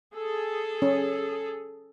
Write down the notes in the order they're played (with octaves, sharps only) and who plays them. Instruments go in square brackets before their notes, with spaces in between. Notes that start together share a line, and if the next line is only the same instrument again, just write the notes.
[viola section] G#4 A4
[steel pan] C#4